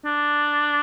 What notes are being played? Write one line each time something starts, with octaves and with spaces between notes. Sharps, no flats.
D4